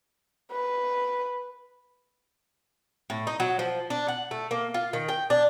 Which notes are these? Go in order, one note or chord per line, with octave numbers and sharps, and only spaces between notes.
B4
A2
D#4
F#3
F3
D4
F#5
A3
A#3
F4
D#3
G5
D4